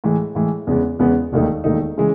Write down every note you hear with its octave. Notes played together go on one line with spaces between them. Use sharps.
A2 E3 G#3
A2 E3 G#3
E2 C#3 G#3 B3
E2 C#3 G#3 B3
E1 D#2 D#3 A3 D#4
E1 D#2 D#3 A3 D#4
C#3 E3 G#3